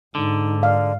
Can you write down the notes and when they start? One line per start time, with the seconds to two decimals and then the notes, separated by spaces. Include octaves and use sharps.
0.15 G#2 D3 D#4
0.63 D5 F5